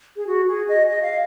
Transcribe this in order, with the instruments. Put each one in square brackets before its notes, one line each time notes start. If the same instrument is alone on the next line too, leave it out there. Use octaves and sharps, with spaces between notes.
[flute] G#4
F#4
G#4
D#5
D#5
F5